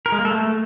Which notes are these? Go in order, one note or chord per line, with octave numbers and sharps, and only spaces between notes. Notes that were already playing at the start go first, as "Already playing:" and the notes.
A#4
G#3
A#3
A4
A3